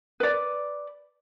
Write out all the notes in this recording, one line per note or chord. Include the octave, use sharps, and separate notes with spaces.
B4 D5